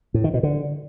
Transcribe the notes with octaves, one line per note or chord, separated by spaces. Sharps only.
A2
D#3
B2
D3